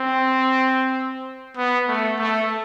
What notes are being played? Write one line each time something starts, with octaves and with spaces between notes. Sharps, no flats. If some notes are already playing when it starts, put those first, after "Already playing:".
Already playing: C4
B3
A3
A3